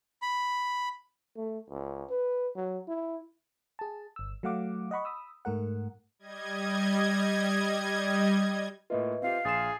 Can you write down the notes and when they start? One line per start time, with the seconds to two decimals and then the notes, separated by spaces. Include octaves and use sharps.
0.22 B5
1.36 A3
1.70 C#2
2.10 B4
2.56 F#3
2.88 E4
3.79 G#4 A5
4.16 G1 E6
4.43 F#3 A3 F5 F#5 D6
4.91 D#5 F#5 B5 C#6
5.05 B5 D#6 E6
5.45 G#2 A3 A#4 F#5
6.19 G3 D#5 G#6
8.90 A2 A#3 F4 B4 D#5 E5
9.22 C4 F4 G4 F5
9.45 A#1 G#4 C6 A6 C7 E7